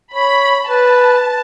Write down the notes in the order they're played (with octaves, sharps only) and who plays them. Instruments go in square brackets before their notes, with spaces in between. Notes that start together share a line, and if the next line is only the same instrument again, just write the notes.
[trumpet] C#5 [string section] B5
[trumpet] B4 [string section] A5